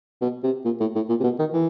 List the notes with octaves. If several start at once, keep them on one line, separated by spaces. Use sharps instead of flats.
B2
C3
A#2
A2
A2
A#2
C3
B2
D#3
E3